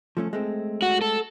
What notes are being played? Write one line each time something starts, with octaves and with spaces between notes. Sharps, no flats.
F3 A3 C#4
G#3 A3 C4
F#4
A4